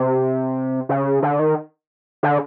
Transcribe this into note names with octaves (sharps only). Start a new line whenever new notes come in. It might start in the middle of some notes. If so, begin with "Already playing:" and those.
Already playing: C3
C#3
D3
D#3
D3